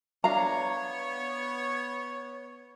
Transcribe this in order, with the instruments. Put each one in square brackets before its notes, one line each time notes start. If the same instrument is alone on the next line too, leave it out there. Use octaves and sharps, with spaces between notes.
[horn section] B3 C#5 [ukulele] D4 F5 A#5